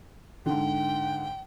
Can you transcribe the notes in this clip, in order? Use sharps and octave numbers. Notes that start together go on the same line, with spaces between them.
G#2 D3 G5